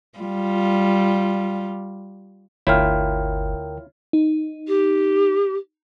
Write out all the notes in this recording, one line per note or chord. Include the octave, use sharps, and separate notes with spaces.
G3 F4
G1 D2 E4 F4 A#4 C#5 G5 F6
D#4
G4